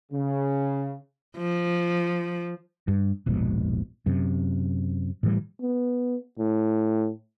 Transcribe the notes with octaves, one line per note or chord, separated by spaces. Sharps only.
C#3
F3
G2
E1 A#1 G#2 B2
F#2 C3
A2 E3 G3
B3
A2